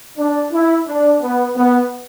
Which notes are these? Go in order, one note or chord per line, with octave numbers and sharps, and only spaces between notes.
D4
E4
D4
B3
B3